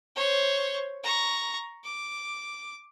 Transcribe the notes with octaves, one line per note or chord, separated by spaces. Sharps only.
C5 C#5
A#5 C#6
D6